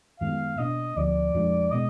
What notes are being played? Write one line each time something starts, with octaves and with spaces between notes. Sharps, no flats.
F#2 D#3 G#3 B3 F5
B2 A#3 D4 D#5
D2 D3 F3 D5
F2 F3 G#3 D4
B2 G#3 B3 D#5